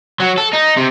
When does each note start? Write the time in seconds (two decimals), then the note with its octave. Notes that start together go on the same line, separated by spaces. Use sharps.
0.20 F#3
0.38 A4
0.53 D#4
0.77 C3